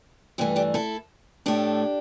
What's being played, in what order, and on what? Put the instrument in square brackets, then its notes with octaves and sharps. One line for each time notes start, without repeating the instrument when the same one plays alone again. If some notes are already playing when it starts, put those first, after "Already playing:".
[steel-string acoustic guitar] G2 E3 A3 C4 E4
D4 G4
E4 A4
A2 A3 D4 G4